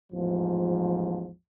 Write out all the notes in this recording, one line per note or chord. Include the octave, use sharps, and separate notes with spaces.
A1 E2 G#2 F3